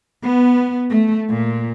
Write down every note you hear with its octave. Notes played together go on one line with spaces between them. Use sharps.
B3
A3
A#2